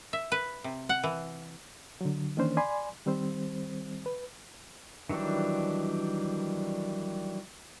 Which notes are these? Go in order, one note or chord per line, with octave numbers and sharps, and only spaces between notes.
E5
B4
C3
F#5
E3
D3 F#3
D#3 E3 A#3 C#4 D4 C5
D5 G#5 B5 C6
D#3 G3 C4 C5
B4
D#3 E3 F#3 G3 D4